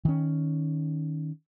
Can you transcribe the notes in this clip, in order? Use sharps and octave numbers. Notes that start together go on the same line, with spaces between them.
D#3 C#4